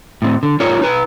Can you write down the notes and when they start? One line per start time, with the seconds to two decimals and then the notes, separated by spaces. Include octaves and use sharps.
0.22 A2 C4
0.43 D3
0.60 D#4 F4 A#4 C#5
0.81 D#4 B4